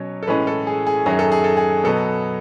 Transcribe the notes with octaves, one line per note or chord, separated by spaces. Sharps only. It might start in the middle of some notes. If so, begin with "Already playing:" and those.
Already playing: B2 F#3 C#4 C#5
A4
A2 E3 G#3 C#4 B4
A4
G#4
G#4
F#2 D#3 F#3 C#4 G#4
A4
G#4
A4
G#4
B2 F#3 B3 A4